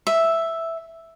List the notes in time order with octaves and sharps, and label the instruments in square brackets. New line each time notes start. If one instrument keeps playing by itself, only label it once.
[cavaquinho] E5